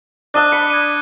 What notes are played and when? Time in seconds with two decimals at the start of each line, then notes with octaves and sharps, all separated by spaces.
0.34 D4 D#5 A5 F#6 D#7 G7
0.52 B5 C#7
0.70 G#6 D#7